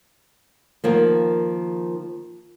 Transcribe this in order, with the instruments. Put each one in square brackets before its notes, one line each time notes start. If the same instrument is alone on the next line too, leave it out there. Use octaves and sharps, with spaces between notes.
[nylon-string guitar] D#3 F3 A#3